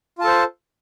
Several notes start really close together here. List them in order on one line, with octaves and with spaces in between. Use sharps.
F4 A5 A4 C5